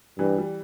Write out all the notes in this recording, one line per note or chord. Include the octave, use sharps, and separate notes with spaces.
G2 E3
G3